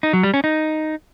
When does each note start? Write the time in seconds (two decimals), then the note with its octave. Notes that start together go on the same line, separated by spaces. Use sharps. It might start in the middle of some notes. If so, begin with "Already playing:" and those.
0.03 D#4
0.13 F#3
0.23 G3
0.34 C#4
0.44 D#4